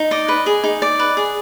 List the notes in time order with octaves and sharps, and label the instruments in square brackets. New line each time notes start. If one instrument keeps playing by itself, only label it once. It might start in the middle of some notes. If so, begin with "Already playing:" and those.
Already playing: [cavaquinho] D#4
D5 D#5
B4
G#4
D#4
D5
B4
G#4